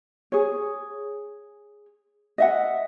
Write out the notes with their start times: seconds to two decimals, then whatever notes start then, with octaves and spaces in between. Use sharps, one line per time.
0.32 G#4 C#5
2.38 D#5 E5 F#5